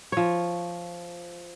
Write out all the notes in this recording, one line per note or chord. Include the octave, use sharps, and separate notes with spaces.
F3 C#5